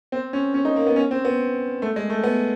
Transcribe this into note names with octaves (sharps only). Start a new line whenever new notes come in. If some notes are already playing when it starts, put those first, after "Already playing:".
C4
C#4
C#4
D#4
A#3
B3
C#4
C4
B3
A3
G#3
A3
B3